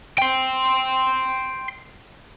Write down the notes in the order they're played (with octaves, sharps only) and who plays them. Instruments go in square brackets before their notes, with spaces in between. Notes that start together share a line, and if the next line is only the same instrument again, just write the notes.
[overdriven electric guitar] G5 C6